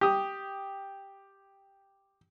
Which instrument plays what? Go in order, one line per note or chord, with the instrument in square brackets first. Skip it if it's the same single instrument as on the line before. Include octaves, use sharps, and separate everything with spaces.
[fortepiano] G4 D#6